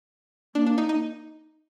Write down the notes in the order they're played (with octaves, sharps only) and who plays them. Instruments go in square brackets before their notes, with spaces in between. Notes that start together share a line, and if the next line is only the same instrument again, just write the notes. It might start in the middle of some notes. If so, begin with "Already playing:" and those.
[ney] A#3 [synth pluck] D4
[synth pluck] D4
D#4
D#4